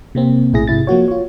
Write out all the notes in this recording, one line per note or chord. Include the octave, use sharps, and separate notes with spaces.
C3 A#3 C4
A#1 A2 E4 G#4 A#6
G#2 C3 E4 A6
F3 A#3 F#4 C#5
F4 C#5